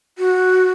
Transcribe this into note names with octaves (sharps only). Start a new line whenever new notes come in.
F#4